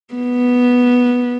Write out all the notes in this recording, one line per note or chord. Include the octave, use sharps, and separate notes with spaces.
B3